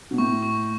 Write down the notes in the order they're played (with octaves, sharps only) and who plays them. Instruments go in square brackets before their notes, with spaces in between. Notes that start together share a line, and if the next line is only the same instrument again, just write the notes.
[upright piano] B2
[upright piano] A2 [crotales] C#6
[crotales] C#6